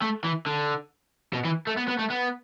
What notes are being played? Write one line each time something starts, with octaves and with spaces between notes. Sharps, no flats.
A3
E3
D3
B2
E3
A3
B3
B3
A3
B3